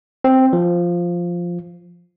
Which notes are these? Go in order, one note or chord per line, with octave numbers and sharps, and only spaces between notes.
C4
F3